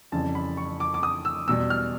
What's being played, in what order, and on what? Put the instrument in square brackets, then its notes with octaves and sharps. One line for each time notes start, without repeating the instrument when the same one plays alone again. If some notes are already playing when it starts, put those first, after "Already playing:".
[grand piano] F2 C#3 E3 G3 A5
B5
C#6
D6
D6
D#6
E6
E2 B2 G3 E6
F6